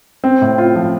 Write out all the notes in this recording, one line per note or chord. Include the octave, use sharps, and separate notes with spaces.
C4
A2
F4
F3